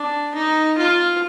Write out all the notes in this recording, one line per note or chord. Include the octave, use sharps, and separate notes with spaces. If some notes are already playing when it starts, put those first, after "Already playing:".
Already playing: D4
D#4
F4